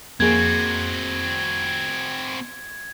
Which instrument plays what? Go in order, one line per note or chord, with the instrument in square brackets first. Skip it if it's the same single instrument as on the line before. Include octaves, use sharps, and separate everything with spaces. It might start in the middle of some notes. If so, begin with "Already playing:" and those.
[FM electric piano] F2 [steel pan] A#3 G#4 [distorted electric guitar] C4 F#4 [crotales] G#6